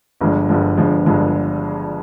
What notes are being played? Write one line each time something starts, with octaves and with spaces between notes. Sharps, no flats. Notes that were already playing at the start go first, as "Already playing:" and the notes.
G1 G2 D3 F3 G#3
G1 G2 D3 F3 G#3
G1 G2 D3 F3 G#3
G1 G2 D3 F3 G#3